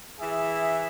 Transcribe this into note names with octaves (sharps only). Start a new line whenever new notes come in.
E3 G#4 E5